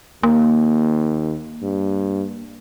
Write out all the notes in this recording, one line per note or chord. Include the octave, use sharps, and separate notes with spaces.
D#2 A#3
G2